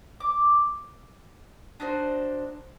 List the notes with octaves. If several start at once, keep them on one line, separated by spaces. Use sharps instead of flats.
D6
D4 D#4 F#4 C5